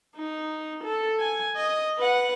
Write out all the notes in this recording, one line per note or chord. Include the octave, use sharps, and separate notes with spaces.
D#4
A4
G#5
D#5
B4 F#5